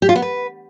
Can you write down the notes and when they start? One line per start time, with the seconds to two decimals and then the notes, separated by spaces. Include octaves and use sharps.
0.02 G4
0.09 F4
0.16 B3
0.22 B4